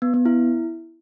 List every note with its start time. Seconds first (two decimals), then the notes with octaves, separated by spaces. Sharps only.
0.02 B3
0.14 B3
0.25 E4